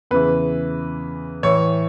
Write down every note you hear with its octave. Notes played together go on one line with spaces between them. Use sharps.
E2 C#3 E3 B4
A2 E3 C#5